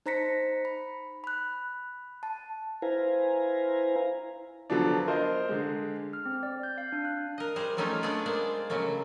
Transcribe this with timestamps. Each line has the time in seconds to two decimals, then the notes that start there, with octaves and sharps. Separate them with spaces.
0.06 D#4 C5 A#5 A#6 B6 C#7
0.65 B5
1.24 B5 F#6
2.23 A5
2.82 E4 B4 C5 F5 G#5 A#5
4.70 D3 F3 F#3 B3 D4
5.08 A#4 C5 D#5
5.49 D3 G#3
6.13 F6
6.26 C4
6.43 D5
6.63 G6
6.78 F5
6.92 D4
7.05 F#6
7.38 A#4 D#5
7.56 G3 G#4 A#4 C5
7.77 F#3 G3 A3 C#4 D#4 F4
8.03 A3 B3 D4 G#4 D5
8.26 G#3 A#3 C5 D5
8.70 C#3 F#3 A3 A#3